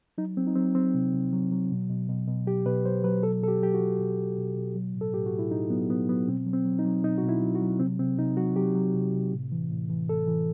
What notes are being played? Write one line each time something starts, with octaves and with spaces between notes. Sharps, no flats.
F#3 D#4
F#3 C4
D#4
F#3 C4
F#3 C4
C3
C3
F#3
F#3
B2
B2
B2
B2
F#3 G4
B2 B4
F#3 C5
F#3 B4
B2 A4
B2 A4
G4
F#3 G4
F#4
F#3
B2
B2
B2
B2
F#3
A2
A4
A2 G4
F#4
A2
E4
A2 D#4
F#3 B3
F#3 B3
F#3 B3
B2 C4
F#3
C4
F#3
D#4
F#3
B2 D#4
F#4
B2
E4
F#3
F#4
F#3
C3 C4
C3 C4
C3 D#4
F#3 F#4
F#3 G4
F#3
C3
C3
A2
E3
A2
E3
A2 A4
E3